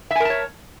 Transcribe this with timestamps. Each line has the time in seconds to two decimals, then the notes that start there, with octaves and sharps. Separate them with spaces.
0.11 E5
0.15 G#5
0.20 A#4
0.25 A5
0.30 C#5